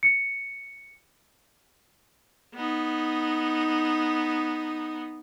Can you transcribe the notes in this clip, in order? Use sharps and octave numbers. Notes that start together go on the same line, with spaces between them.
C#7
B3 D#4